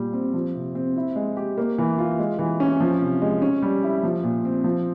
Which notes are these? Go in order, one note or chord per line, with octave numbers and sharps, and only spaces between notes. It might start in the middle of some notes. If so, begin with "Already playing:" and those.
Already playing: A#2 G3
C4
F3
C3
C4
E4
G#3
G4
A#3
E3
F4
G#3
E3
C#4
F3
C3
G#3
C#4
G3
E4
F3
A#2
C4
F3